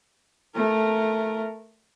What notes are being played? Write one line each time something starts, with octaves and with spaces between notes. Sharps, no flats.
A3 A#4